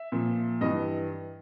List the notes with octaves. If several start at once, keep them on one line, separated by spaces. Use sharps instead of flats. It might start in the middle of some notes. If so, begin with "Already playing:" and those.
Already playing: E5
A#2 F3
G2 E3 D#5